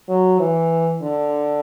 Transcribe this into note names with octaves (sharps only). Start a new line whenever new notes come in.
F#3
E3
D3